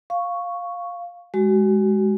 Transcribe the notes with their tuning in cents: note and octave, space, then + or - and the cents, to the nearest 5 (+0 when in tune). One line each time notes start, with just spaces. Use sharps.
F5 +5 C#6 +0
G#3 +0 F#4 +35